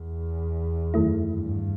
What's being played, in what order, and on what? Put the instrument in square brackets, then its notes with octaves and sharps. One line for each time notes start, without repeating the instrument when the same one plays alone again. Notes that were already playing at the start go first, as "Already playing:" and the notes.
Already playing: [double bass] E2
[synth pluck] F#2 D#3 A3 E4
[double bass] G2